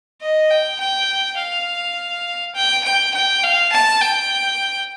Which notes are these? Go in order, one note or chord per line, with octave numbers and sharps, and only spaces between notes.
D#5
G5
G5
F5
G5
G5
G5
F5
A5
G5